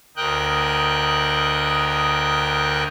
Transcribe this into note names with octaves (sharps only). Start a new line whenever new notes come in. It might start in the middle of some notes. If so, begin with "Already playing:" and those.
D2 A#4 D#5 G5 F#6